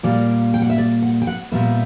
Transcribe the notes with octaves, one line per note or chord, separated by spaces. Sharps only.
A#2 G3 A#3 D5
G5
F#5
E5
D5
F#5
G5
F#5
A#2 G3 B3 E5